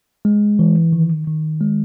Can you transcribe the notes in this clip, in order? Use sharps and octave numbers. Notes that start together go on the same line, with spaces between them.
G#3
E3
D#3
D#3
G#3